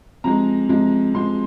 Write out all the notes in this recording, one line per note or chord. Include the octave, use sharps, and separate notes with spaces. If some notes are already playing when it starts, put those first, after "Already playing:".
C3 F3 G#3 A#5
C3 F3 G#3
C3 F3 G#3 C6